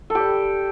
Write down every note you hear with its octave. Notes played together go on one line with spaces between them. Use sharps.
G3 G4 A4